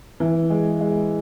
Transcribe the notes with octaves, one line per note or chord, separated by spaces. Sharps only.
E3
G#3
G#3